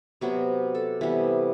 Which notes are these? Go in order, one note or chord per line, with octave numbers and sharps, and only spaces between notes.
C3 F#3 B3 F#4
A4
C3 E3 G3 B3